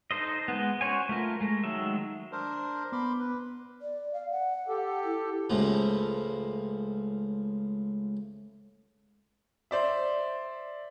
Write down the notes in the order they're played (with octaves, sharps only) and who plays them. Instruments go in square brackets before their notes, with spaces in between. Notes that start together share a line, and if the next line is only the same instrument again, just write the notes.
[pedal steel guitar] D#4 A4 C5 D#5
G#3 B3
C#4 F#4 C5 C#5 G#5
A3 F4 A#4
G#3 A3
D#3 F#3 G#3 E5
[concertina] D4 A#4 C5
[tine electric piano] B3 [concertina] B5 C6 D6
[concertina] B4
[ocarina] D5
F5
F#5
[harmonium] G4 A4
[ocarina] E4
[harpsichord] C#2 A2 F3
[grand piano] C5 D5 E5